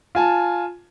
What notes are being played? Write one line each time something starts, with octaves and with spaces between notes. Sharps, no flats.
F4 G#5 A5